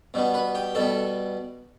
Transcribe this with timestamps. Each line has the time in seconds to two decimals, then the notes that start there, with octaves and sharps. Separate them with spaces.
0.14 B2 G3 B3
0.34 B4
0.55 G4
0.75 B2 G3 B3 A4